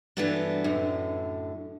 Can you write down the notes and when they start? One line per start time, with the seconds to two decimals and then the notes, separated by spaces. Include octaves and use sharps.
0.17 G2 E3 F#3 A3 B3 D4
0.64 F#2 A2 D3